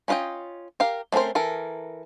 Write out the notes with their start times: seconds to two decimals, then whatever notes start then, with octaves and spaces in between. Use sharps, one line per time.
0.08 C#4 F4 B4 D#5 G5
0.80 G4 A#4 F5
1.12 A3 C4 C#4 A#4 C5
1.35 E3 A4 A#4